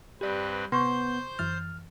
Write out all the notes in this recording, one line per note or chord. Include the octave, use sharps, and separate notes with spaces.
G2 C4 G4 B4 D5
C3 B3 C5 C6 C#6 G6
F#2 E3 F6 A6